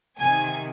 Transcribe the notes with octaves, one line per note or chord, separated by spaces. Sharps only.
C3 D#3 G#5